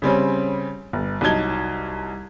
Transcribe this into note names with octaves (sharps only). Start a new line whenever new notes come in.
C#3 G3 C4 C#4
G1
C2 F#3 D#4 A5 G#6 G7